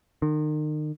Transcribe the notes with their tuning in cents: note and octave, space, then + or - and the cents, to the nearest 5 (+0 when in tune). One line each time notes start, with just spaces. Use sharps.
D#3 -35